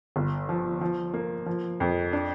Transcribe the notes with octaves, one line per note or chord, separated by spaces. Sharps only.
G1
F3
F3
A#3
F3
F2
D4